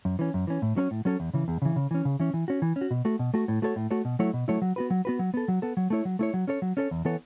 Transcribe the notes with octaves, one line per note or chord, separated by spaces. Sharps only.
F#2
E3 C#4
F#2
E3 C#4
A2
F#3 C#4 A4 C#5
A2
F#3 C#4 A4 C#5
E2
C#3 E3
E2
C#3 E3
C#3
E3 C#4
C#3
E3 C#4
E3
C#4 F#4
E3
C#4
F#4
B2
A3 F#4
B2
A3 F#4
A2
A3 F#4 A4 C#5
A2
A3 F#4 A4 C#5
B2
F#3 A3 E4 C#5
B2
F#3 A3 E4 C#5
F#3
B3 F#4 B4
F#3
B3 F#4 B4
F#3
B3 A4
F#3
B3 A4
F#3
A3 E4 C#5
F#3
A3 E4 C#5
F#3
C#4 A4 C#5
F#3
C#4 A4 C#5
E2
E3 B3 A4 C#5